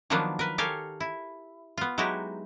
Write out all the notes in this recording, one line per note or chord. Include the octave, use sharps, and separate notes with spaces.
D#3 F3 F#3 A#3 B3 D4
A#4 B4
G4 A4 A#4 C#5 F5 G#5
E4
B3 F4
F#3 G#3 D#4 E4 F#4 G4